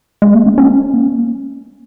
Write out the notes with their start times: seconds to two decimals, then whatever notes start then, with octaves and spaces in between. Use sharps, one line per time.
0.22 G#3
0.34 A#3
0.46 C#4
0.58 C#4
0.94 A#3